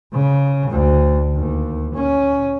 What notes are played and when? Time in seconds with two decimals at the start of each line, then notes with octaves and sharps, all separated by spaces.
0.13 C#3
0.71 D2
1.36 D#2
1.94 C#4